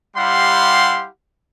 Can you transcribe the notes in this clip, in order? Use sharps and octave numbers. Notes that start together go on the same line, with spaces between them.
G3 E4 G4 F5 F#5 C6